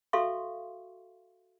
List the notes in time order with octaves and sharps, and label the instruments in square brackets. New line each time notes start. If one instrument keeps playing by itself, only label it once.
[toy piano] F#4 A4 E5 F5 C6 C#6